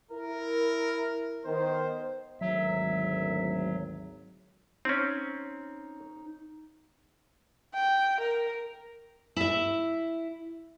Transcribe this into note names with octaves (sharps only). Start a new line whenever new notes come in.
E4 A#4
D#3 B3 C5
G#1 D2 F#3 E5
C4 C#4 D#4
G5
A#4
E4 E5